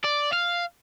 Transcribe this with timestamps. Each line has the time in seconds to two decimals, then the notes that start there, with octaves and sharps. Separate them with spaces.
0.04 D5
0.33 F5